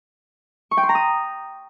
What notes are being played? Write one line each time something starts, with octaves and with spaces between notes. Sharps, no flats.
C#6
G5
C6
A#5
D#6